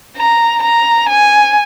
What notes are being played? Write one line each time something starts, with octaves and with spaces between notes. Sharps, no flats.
A#5
A#5
G#5